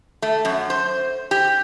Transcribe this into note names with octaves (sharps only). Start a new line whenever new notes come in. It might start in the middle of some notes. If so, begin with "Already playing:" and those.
A3
F#2
C5
G4